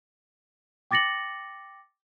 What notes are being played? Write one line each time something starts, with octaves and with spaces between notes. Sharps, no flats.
G5 D6 A6 A#6 C#7 F#7